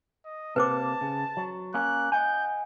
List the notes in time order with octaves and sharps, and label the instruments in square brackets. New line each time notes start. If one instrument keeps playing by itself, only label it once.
[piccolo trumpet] D#5
[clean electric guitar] C3 A#3 [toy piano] B4 C5 D6 [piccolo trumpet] A5
[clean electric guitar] C#3
F#3
[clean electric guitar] A#3 C#4 [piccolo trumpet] F#6
[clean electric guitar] D#5 F#5 G#5 [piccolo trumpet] G6